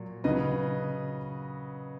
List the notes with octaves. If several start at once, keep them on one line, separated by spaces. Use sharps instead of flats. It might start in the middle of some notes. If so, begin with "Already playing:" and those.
Already playing: A#2 F#3
C#3 F#3 B4 D#5